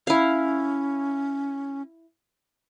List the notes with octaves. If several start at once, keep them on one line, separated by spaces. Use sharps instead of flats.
C#4 E4 F5